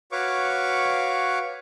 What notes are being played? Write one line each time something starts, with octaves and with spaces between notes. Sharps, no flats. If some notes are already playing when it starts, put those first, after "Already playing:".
F#4 B4 C#5 F5 C#6 D6